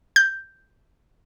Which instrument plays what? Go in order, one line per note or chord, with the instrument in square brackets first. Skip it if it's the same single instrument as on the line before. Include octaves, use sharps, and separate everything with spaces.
[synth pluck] G6